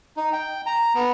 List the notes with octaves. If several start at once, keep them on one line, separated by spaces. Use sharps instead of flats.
D#4
G5
A#5
B3